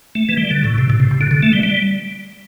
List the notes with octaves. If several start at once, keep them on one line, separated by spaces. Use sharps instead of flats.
A3
E3
G3
D3
A2
C3
A2
C3
C3
D3
D3
A3
G3
G3